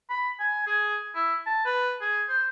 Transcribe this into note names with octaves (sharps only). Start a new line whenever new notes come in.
B5
G#5
G#4
E4
A5
B4
G#4
C5